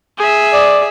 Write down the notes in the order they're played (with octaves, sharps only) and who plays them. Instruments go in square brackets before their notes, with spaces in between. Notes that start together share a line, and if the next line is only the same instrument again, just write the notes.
[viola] G#4 E5
[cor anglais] D5